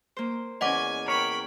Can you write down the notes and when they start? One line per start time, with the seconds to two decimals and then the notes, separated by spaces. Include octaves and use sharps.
0.17 A#3 C5
0.61 E2 C#4 D#5 F#5 G#5 D6
1.08 A#4 C#5 G5 B5